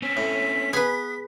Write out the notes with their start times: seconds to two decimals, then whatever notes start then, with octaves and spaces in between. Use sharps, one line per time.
0.02 C4 C#4 B6
0.17 A2
0.73 B3 G#4 B4